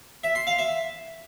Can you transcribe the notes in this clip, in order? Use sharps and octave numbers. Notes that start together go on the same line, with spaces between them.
E5
C6
F5
E5